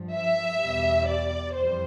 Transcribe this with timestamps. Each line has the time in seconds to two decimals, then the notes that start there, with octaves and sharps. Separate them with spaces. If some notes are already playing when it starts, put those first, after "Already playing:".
Already playing: G2 F3
0.14 E5
0.60 E2 B2 G3
1.06 D5
1.52 F2 E3 G3 C5